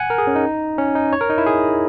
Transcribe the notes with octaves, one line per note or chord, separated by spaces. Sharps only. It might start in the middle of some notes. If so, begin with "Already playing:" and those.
Already playing: F#5 G#5
A#4
G#4
C#4
D#4
C#4
D#4
C#5
A#4
D#4
E4
G#4